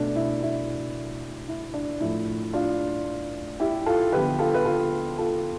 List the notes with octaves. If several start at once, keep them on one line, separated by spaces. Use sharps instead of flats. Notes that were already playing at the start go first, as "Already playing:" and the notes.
Already playing: B2 A3 D4
E4
E4
E4
D4
A2 F3 A3 E4
D4 F4
E4 G4
F4 A4
D3 F3 B3 G4 B4
F4 A4
B4
F4 A4
F4 A4